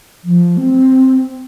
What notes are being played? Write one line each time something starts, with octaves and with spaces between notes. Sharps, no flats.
F3
C4